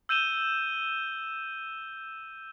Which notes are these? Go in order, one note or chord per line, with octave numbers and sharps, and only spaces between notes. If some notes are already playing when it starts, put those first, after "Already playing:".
E6 G6 D#7 E7 G7